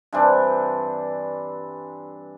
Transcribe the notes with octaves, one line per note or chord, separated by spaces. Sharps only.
G2 E3 C4 D4